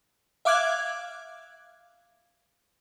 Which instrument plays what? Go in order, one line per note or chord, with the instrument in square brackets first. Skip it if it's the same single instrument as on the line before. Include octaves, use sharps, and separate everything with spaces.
[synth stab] E5 F5 D6 F#6 G#6